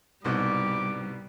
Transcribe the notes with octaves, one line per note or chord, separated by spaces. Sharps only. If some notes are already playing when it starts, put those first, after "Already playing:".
C2 G#2 B2 G3 D6